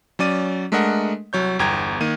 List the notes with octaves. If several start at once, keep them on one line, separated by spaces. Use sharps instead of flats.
F#3 C#4 D5 D#7
G#3 A3 D4 A#4 D#5 F#5
C2 F#3 C#5 G6
G1 E2 G5 A#5 G#6
D#3 A#3 D#7